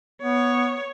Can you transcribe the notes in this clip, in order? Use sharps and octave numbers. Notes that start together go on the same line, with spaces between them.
B3 C#5